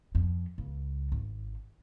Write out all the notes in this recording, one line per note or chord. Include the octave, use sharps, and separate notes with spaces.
F2
C#2
G#1